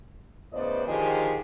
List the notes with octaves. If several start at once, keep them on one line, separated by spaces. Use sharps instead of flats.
A2 C#3 B3 C5 D5 D#5
D3 D#3 F3 G#3 G4 G#4